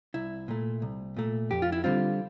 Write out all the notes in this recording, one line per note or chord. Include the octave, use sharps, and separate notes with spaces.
C2 E4
A#2 A3
C2
A#2 A3
F2 G4
F4
E4
D3 G3 C4 F4